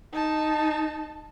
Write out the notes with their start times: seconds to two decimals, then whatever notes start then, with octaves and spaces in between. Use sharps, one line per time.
0.12 D#4 A5